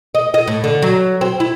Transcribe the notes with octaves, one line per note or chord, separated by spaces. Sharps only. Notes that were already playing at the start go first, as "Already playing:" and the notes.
D#5
D#5
A2
D3
F#3
C4
E4